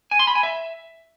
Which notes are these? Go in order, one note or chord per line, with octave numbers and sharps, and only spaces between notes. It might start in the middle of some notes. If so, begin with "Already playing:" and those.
G#5
C6
B5
G#5
E5